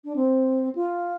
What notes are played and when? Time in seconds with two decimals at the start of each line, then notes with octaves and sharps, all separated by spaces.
0.05 D4
0.16 C4
0.75 F4